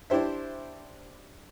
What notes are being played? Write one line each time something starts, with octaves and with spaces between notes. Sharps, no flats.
D4 E4 G4 C5 E5